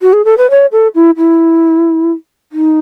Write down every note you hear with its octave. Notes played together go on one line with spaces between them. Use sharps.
F#4
G#4
A4
B4
C#5
A4
E4
E4
D#4